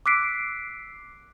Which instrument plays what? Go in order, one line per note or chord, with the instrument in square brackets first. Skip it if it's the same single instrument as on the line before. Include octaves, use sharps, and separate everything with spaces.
[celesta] D6 E6 F#6 B6 C7 D7